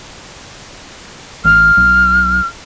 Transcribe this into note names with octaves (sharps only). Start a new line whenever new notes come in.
A1 F6
B1